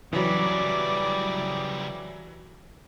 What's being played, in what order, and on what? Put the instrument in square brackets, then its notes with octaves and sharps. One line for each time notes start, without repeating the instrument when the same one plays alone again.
[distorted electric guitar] C#3 G3 [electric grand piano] E3 F#3 [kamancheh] D5